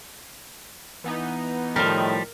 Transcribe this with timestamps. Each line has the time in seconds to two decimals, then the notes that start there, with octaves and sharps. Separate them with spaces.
1.04 E3 B3 D#4
1.76 A2 D#3 F3 G3 A#4